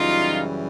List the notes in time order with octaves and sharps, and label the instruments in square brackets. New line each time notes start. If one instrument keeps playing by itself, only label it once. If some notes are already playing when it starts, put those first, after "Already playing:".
Already playing: [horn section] F#2 C#3 E3 G3 D#4 F4